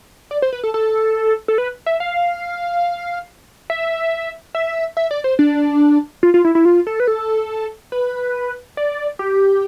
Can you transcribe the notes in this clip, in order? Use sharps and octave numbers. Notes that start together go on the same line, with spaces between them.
D5
C5
B4
A4
A4
A4
B4
E5
F5
E5
E5
E5
D5
C5
D4
F4
F4
E4
E4
F4
A4
B4
A4
B4
D5
G4